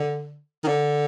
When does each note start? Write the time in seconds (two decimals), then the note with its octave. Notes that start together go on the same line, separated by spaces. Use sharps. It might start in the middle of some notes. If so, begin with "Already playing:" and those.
Already playing: D3
0.64 D#3
0.68 D3